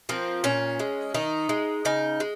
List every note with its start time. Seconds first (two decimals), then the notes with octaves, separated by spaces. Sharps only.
0.09 F3 A#3 C4
0.44 A#2 C#4
0.79 G#3
1.14 D#3 D#4
1.49 G#3
1.85 C#3 D#4
2.20 G#3